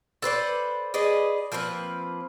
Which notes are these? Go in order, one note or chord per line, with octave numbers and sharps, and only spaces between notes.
A4 B4 C5 D5
G#4 B4 D5 D#5
F3 A#3 C4 B4